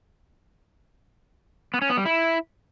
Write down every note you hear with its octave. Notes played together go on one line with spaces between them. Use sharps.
B3
C#4
B3
G3
E4